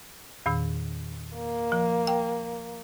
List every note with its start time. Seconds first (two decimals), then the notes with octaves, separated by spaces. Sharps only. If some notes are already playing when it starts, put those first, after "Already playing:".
0.46 E2 A#2 D#3
1.37 A#3
1.72 F3
2.07 G5